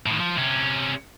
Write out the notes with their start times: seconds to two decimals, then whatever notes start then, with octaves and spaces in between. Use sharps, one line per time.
0.06 A2 D#3
0.20 F3
0.38 C3 C#4